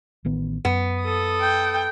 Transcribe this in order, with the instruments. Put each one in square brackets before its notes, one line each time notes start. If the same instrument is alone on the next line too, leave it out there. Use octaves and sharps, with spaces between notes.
[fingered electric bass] A1 D#3 B3
[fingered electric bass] F#2 [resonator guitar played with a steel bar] B3
[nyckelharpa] A4 D#6
[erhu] G5